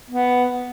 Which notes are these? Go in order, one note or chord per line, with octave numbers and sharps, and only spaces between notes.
B3